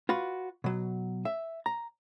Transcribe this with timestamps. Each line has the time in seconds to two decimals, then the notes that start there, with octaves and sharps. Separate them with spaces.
0.09 F4 F#4 B4
0.64 B2 F#3
1.25 E5
1.66 A#5